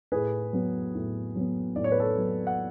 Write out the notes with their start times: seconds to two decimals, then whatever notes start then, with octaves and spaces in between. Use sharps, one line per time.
0.12 A2 G#4 B4
0.53 F#3 B3
0.95 A2
1.35 F#3 B3
1.76 A2 D5
1.84 C#5
1.92 B4
1.99 A4 C#5
2.18 F#3 B3
2.47 F#5